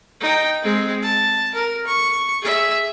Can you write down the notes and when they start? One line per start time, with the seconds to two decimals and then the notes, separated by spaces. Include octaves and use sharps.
0.21 D#4 G5
0.63 G#3 C4
1.03 A5
1.55 A#4
1.87 C#6
2.42 G#4 E5